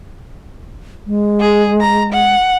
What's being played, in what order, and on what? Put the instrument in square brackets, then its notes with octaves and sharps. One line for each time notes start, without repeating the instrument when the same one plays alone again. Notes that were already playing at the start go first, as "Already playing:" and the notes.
[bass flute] G#3
[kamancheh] G#4
A#5
F#5